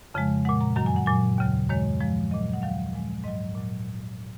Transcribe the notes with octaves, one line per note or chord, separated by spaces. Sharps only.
F2 C#3 F3 G#3
A#2 G#3 F#5
A#5
F#2 D#3 F#3 A#5
G#5
F#5
A#2 F#3 G#5
D#2 C#3 F#3
F#2 D#3 G#3 C#5
F#2 F3 G#3
A#2 F#3 D#5
F#5
D#2 D#3 F#3 F5
A#2 F3 G#3
G#2 F#3 D#5
A#2 F#3